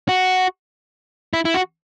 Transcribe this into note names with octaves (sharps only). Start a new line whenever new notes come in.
F#4
E4
E4
F#4